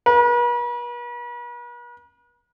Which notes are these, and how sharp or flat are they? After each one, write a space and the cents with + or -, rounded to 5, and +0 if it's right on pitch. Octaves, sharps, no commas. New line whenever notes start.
B4 -45